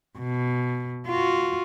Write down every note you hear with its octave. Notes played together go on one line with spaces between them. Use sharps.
B2
F4 F#4